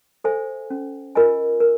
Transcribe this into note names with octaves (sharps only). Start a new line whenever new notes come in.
A4 C5 E5 G#5
C#4
F4 A#4 D#5 G#5
A#4